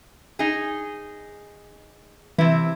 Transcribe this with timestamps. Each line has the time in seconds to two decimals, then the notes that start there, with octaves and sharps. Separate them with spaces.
0.39 D#4 G#4
2.38 C3 E3 E4